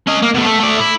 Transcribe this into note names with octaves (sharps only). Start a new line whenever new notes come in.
C#4 D#5
A#3
B2 A3
A3
A3 D5
E4